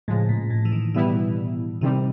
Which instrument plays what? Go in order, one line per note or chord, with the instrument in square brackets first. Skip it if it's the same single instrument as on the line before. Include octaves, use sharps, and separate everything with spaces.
[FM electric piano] A2 [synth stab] C#3 F3 G#3
[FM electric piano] A#2
A2
E3
D#3
[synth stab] B2 G3 B3 E4 [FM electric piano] E3
[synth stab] C3 D#3 G3 C4 [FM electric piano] E3